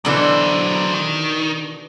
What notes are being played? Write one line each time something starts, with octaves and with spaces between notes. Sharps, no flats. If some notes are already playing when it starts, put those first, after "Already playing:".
B2 D3 E3 F#3 C5
D#3